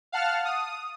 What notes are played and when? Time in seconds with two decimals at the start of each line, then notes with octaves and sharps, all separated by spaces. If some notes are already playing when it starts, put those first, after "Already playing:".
0.12 F5 F#5 A5 F6
0.45 D#6